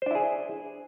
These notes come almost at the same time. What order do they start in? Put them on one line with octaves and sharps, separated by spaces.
C5 D4 E4 G#4